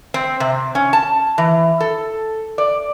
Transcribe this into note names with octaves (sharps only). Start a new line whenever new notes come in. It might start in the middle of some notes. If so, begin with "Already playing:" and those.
C4
C3
C#4
A5
E3
A4
D5